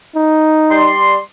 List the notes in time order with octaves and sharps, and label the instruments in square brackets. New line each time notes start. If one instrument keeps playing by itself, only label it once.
[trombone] D#4
[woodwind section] G3 D5 C6